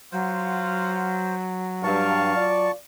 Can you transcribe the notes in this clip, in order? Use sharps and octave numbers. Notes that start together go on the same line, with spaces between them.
F#3 F4 C5 F5 F#5
G2 F5 A5 C#6
F4 D5